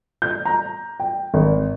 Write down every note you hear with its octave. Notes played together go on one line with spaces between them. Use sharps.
G6
A#5
G5
G#1